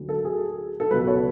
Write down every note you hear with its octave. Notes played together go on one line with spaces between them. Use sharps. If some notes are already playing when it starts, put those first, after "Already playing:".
Already playing: D2 D3 F#3
A4
G#4
A4
C#2 B2 F#3 B4
C#5